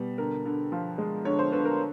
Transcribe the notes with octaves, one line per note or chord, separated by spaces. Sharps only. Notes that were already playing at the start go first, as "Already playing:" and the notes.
Already playing: B2 G3
D3 A#4
D3
F3
G#3
D3 C#5
C5
D3 B4
A#4